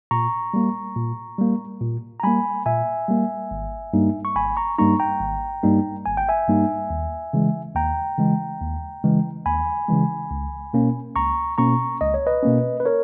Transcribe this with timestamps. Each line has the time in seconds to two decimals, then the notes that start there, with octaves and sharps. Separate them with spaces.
0.11 A#2 A#5 C#6
0.54 G3 A#3
0.96 A#2
1.39 G3 A#3
1.81 A#2
2.20 A#5
2.23 G3 A#3 G#5 B5
2.66 A#2 E5 G#5
3.09 G3 A#3
3.51 G#1
3.93 G2 G3 A#3 D#4
4.25 C#6
4.36 G#1 G#5 B5
4.57 A#5 C#6
4.78 G2 G3 A#3 D#4 A#5 C#6
4.99 G5 A#5
5.20 G#1
5.63 G2 G3 A#3 D#4
6.06 G#1 G#5
6.17 G5
6.29 E5 G#5
6.48 G2 G3 A#3 D#4
6.90 D#2
7.33 C#3 E3 G#3
7.76 D#2 G5 A#5
8.18 C#3 E3 G#3
8.61 D#2
9.04 C#3 E3 G#3
9.46 D#2 G#5 B5
9.88 C#3 E3 G#3
10.31 C#2
10.74 B2 A#3 C#4
11.16 C#2 A#5 C#6
11.58 B2 A#3 C#4 A#5 C#6
12.01 C#2 D#5
12.14 C#5
12.27 B4 D#5
12.43 B2 A#3 C#4
12.80 B4
12.85 A#4 C#5